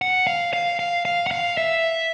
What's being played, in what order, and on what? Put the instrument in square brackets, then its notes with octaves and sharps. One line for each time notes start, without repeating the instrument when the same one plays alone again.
[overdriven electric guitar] F#5
F5
F5
F5
F5
F#5
F5
E5